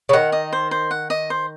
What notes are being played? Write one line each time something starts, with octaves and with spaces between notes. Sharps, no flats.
C#3
D#3 F#5
D#5
C5
C5
F#5
D#5
C5